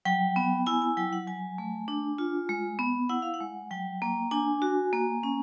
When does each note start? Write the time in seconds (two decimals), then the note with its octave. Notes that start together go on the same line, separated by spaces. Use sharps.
0.05 F#3 G5
0.36 B3
0.66 E4 G#5
0.82 G#5
0.97 F#3 G5
1.13 F#5
1.27 F#3 G#5
1.58 A3
1.88 D4
2.18 F4
2.49 G#3
2.79 B3
3.09 E4 F#5
3.22 F5
3.34 F#5
3.40 G#3
3.70 F#3 G5
4.02 A#3
4.31 D4 G#5
4.62 F#4
4.93 A#3
5.23 C#4